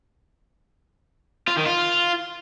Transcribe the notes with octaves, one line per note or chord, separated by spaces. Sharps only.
F4
D#3
F4